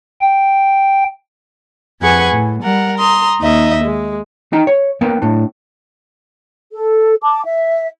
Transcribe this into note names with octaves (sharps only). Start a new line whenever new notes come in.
G5
F2 G#4 B4 F#5 G#5 C#6
A2
G3 A#4 F#5
A#5 C6 D#6
D#2 D#4 D#5 E5
G#3
D#4 G5 A#5
C#5
A#3 B3 A#4 G5
A2 D4
A4
A5 D6
E5